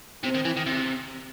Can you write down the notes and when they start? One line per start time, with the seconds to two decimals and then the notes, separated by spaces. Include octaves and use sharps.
0.23 C3 C4
0.34 D#3
0.45 E3
0.57 D#3
0.67 C3